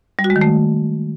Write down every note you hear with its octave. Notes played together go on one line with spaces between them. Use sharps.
G3
F#4
G#3
D#3
A3